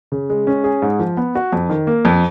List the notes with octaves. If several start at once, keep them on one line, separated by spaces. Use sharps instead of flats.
C#3
G#3
C#4
G#4
G#2
F3
B3
F#4
F2
D#3
A#3
F2